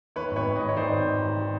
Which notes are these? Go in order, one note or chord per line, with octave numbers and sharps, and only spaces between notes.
D#3 B4 C#5
G#1
B4 C#5
G#1
C#5 D#5
G#2
C#5
D#3 C5 D5
G#1
G#1
G#2
D#3